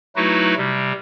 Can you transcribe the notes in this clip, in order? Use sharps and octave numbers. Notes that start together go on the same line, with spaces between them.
F#3 A3 D#4 E4 F#4 B4
C3 G3